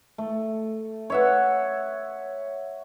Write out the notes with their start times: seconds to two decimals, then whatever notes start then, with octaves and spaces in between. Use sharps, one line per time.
0.18 A3
1.10 C#5 E5 F#5